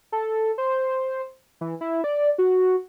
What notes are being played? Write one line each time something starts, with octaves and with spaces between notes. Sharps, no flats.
A4
C5
E3
E4
D5
F#4